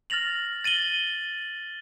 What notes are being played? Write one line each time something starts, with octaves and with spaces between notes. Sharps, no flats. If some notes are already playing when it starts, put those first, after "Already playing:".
F6 A6 A#6 F7 F#7
A6 D#7 F#7 G7